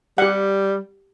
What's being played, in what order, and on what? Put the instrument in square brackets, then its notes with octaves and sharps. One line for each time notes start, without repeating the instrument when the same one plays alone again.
[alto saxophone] G3 [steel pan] G4 F#5